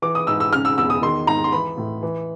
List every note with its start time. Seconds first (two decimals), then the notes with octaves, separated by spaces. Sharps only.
0.02 E3 D6
0.15 D#6
0.27 G#2 E6
0.40 E6
0.53 C#3 F6
0.65 E6
0.78 E2 E6
0.90 D#6
1.02 D#3 C6
1.27 G#2 A#5
1.44 C6
1.52 E3 B5
1.78 A2
2.03 E3